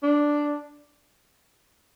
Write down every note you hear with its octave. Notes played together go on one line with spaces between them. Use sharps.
D4